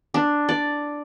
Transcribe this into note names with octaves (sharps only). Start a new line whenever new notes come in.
D4
D5